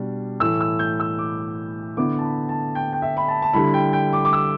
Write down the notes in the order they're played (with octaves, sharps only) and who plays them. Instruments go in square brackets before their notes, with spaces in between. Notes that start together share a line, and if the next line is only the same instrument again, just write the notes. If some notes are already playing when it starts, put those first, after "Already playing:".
Already playing: [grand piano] B2 G3 D4
A2 E3 A3 E6
E6
G6
E6
D6
D3 B3 E4 D6
A5
B5
A5
G5
G5
E5
B5
A5
A5
D3 G3 E4 B5
G5
G5
D6
D6
E6